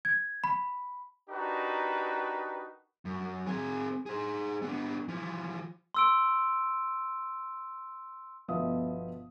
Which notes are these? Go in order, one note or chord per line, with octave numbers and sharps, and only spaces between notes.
G#6
B5
D4 D#4 F#4 G4 A#4 B4
F#2
C4 G#4
G#4 C5
B3 D4
E3 F3
C6 E6 D7
G1 B2 F3 B3 E5 D#6